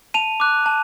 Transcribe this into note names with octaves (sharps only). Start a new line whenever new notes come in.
A5 D#7 F7
D6 F#6
A5